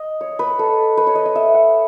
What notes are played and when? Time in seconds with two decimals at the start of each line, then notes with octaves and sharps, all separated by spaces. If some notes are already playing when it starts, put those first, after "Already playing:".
Already playing: D#5
0.21 C#5
0.39 B4
0.59 A4
0.97 B4
1.07 C#5
1.15 D#5
1.26 D#5
1.35 E5
1.54 F#5